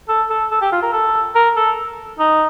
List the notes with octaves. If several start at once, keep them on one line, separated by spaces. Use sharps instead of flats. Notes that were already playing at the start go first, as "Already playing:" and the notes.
A4
A4
A4
G4
F4
A#4
A4
A#4
A4
D#4